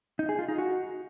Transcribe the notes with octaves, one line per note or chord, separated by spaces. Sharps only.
D#4
G#4
F4
D#4
F#4